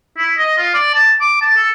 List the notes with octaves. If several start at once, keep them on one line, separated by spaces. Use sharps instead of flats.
E4
D#5
F4
D5
A5
D6
A5
A4